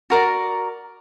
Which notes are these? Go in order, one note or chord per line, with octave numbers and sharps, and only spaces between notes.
F#4 A#4 D5